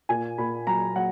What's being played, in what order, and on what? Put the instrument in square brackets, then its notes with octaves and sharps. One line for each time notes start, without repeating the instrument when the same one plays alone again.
[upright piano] A#2 G#5
A#2 B5
F#3 A#5
F#3 F#5